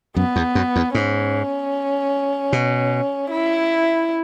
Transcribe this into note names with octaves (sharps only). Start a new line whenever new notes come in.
F#2 B3
E2
F#2
E2
G#2 C#4
B2
E4